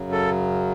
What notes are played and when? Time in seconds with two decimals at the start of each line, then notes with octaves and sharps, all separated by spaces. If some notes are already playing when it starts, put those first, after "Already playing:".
Already playing: F#2 C#3 F#3
0.12 A4